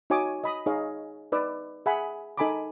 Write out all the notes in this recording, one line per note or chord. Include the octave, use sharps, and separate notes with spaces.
D#4 F#4 C#5 G#5 D6 D#6
D#5 B5 D#6
D#4 G#4 C#5 D#5 F5
D#4 B4 D5 D6 E6
G#4 E5 F#5 G#5 B5
D#4 A4 G#5 B5 C6 D6